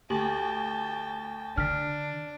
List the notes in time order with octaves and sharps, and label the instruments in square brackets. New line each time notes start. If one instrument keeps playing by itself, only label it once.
[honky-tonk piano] D2 [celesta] G4 F#7 [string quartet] G5 A5
[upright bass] D3 [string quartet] D4 [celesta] F6 B6